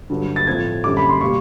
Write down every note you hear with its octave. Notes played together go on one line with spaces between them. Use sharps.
G2 D3 F#3
A6
A2 F3 A3 C4 G#6
F#2 D3 G3 D6
B5
C6
B2 G3 A#3 C#6